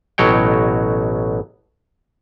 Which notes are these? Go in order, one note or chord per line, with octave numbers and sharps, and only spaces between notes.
A1 B2 F#3 C#5 G5